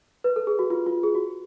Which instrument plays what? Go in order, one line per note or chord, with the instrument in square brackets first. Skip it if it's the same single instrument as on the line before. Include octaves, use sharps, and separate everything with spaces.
[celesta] B4
A4
G#4
F#4
F4
F4
G#4
F#4